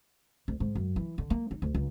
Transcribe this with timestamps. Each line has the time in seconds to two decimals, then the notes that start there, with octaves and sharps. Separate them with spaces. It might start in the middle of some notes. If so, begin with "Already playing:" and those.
0.48 D2
0.60 G#2
0.75 F#2
0.96 E3
1.18 D3
1.30 A#3
1.51 D#4
1.62 D2
1.74 C#2